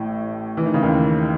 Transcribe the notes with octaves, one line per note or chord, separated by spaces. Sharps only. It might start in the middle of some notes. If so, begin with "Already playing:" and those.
Already playing: A1 A2
E3
D#3
C#3
D#2 D#3